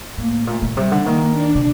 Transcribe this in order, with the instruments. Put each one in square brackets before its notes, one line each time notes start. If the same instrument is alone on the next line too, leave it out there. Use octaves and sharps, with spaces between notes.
[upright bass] A2 [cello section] A#3
[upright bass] A#2 [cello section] A3
[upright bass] A#2
[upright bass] C3 [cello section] G3
[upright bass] D3
[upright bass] D#3 [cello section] A#3
[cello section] D4
[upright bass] C3